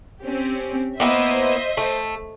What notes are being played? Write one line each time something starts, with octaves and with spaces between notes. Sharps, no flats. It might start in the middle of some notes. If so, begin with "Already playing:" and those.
C4 C#4 G4
A#3 B3 E4 C5 D#5 E5
A3